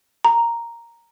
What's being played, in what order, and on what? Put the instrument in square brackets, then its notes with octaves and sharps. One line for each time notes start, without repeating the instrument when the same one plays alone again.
[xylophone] A#5